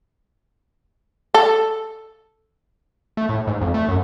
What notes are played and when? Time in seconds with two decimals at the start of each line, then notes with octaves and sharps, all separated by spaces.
1.34 A4
3.17 A3
3.29 A2
3.47 G#2
3.61 F2
3.74 A3
3.88 F#2